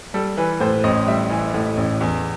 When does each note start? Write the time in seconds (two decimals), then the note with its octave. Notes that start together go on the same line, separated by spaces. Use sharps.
0.14 G3 A4
0.37 E3 B4
0.60 A2 C5
0.84 A1 D#5
1.08 G3 E5
1.30 E3
1.54 A2
1.77 A1
2.01 E2